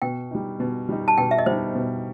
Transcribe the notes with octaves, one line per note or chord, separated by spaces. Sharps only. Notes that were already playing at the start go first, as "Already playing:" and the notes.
B2 G5
G3 D#4
B2
G3 D#4
A5
B2 G5
E5
D#5
G3 D#4 C5
B2